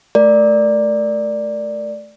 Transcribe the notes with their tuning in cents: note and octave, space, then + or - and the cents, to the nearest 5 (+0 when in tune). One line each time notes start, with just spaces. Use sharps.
A3 -20 A#4 +0 D5 +0